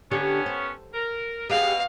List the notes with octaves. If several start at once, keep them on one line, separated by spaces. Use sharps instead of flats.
D3 B3 C#4 D4 G4
C5
A#4
B2 G4 G#4 F5